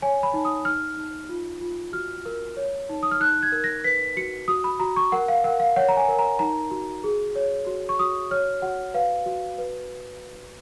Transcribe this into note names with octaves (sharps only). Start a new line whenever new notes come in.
C#5 G#5
B5
D#4
D#6
D#4 F6
D#4
F4
F4
F#4 F6
A#4
C#5
D#4
D#6
F6
D#4 F#6
G#6
A#4
A#6
B4 B6
F#4 C#7
F#4 D#6
B5
F#4 A#5
C#6
A#4 F#5
F5
A#4 F#5
F5
C#5 F#5
A#5
G#5
A#4
A#5
D#4 A#5
F#4
G#4
C#5
F#4
C#6
F#4 D#6
C#5 F6
F#4 F#5
B4 F5
F#4
B4